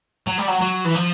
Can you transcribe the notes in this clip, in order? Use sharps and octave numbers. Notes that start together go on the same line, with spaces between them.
F#3
G3
F#3
F#3
E3
F3